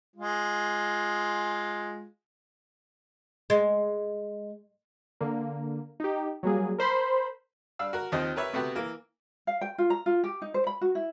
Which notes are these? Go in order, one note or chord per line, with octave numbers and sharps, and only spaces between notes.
G#3 F4
G#3
D3 A#3
D#4 G4
F#3 G3 A#3 G#4
A#4 C5 B5 C6
G3 D4 F5 E6
F#4 A#4
D#2 D#3 F3 C4 D#5
G4 A#4 B4 C#5 E5
C3 A3 B3 F#4 G4
E3 A#3
F5
G5
F4
A#5
F4
G4
D#4
C5
B5
F#4
E4